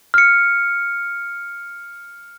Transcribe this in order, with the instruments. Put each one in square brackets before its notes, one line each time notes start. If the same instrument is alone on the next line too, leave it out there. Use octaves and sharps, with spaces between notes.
[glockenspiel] F6 C#7